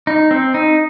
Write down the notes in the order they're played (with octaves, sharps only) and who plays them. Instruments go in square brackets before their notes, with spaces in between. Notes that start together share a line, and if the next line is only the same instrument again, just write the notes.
[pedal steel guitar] D#4
C4
D#4